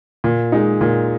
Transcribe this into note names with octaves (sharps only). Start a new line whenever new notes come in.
A#2
G#3 D#4
A#2